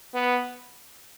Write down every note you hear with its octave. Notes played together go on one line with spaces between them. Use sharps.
B3